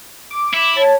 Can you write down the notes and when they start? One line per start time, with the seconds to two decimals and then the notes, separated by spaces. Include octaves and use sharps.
0.31 D6
0.53 E4
0.77 C#5 A5